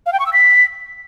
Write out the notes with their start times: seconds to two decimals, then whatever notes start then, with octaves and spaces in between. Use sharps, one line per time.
0.06 F5
0.13 G5
0.20 C#6
0.26 E6
0.33 B6